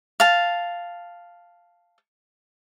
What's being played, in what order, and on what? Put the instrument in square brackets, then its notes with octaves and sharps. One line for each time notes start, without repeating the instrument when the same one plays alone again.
[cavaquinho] F5 A5